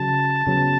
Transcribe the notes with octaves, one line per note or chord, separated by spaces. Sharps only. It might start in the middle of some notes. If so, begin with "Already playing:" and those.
Already playing: C#3 F#3 A5
C#3 F#3 B3